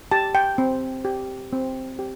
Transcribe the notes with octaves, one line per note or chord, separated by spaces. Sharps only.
G4 A5
G5
C4
G4
C4
G4